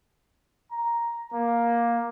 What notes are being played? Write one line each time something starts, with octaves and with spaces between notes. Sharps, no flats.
A#5
A#3